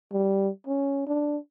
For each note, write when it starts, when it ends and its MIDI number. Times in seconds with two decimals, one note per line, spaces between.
0.13 0.49 55
0.67 1.03 61
1.07 1.37 62